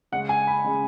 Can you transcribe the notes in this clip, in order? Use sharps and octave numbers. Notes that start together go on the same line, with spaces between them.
C#3 G#3 C#4 F#5
G#5
B5
C#3 G#3 C#4